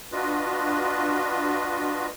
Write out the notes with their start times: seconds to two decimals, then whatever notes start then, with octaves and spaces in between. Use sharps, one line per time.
0.12 D4 F4 F#4 B4 D#5